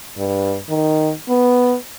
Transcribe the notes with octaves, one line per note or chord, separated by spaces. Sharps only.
G2
D#3
B3